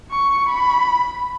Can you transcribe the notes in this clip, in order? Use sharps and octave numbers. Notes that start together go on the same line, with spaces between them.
C#6
B5